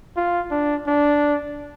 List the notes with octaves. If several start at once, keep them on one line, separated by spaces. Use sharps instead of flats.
F4
D4
D4